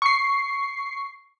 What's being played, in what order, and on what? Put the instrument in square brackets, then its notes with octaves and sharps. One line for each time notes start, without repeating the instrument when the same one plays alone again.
[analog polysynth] C#6 C7